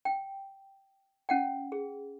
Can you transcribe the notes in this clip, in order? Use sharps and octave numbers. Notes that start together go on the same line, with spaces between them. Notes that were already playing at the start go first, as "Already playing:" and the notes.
G5
C#4 F#5 G5
G#4